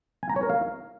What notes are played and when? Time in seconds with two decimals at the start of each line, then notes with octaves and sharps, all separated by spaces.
0.23 G#5
0.30 A#5
0.36 C#5
0.43 A#4
0.50 F5